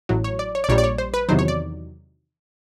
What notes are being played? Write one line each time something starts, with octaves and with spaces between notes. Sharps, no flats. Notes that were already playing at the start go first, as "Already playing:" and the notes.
A1 A2 F#3
C#5
D5
C#5
D5
A#1 A#2 G3 C#5
D5
C#5
C5
B4
E2 C3 D#3 F#3 C5
C#5
D5